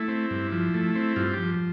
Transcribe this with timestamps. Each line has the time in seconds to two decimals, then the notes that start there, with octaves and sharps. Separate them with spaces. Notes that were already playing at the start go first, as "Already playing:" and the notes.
Already playing: A3 E4
0.08 C4
0.31 G2
0.52 F3
0.74 A3
0.95 C4
1.16 G2 F4
1.33 F3 G4